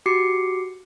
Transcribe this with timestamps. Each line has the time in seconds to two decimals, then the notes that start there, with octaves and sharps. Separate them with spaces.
0.06 F#4 G4 D6 C7 C#7